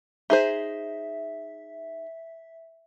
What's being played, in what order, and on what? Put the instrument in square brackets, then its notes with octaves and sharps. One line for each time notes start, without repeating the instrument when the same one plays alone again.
[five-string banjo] D#4 G#4 C5 [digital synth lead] E5